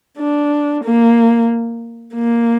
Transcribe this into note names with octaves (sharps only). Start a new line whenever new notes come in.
D4
A#3
A#3